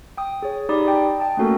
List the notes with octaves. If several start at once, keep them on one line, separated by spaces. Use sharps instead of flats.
G5 D#6
G#4 C#5
D#4 G4 D5 B5 D#6
D#5 G5 A5
D#5 G5 A5 D#6
A3 A#3 C#4 F#4 A4 A#4